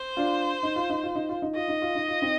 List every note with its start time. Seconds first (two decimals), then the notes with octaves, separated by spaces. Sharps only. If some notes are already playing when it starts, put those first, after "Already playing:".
Already playing: C5
0.17 D4 F4
0.63 D#4
0.76 F4
0.90 D#4
1.03 F4
1.15 D#4
1.29 F4
1.42 D#4
1.55 F4 D#5
1.68 D#4
1.82 F4
1.95 D#4
2.08 F4
2.22 C4 D#4